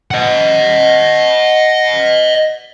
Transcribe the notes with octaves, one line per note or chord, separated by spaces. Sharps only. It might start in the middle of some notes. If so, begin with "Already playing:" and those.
D#5 F#5